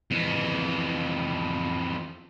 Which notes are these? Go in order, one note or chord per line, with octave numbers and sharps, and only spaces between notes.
F2 E3